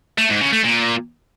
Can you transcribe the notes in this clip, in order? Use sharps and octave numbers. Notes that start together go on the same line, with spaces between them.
A3
G#2
C#3
A3
A#2